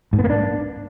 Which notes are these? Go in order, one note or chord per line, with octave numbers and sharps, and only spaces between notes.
G#2
B3
A#3
D4